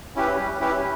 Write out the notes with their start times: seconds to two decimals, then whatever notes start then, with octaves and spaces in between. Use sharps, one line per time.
0.16 C#4 E4 G4 B4
0.38 G3
0.60 C#4 E4 G4 B4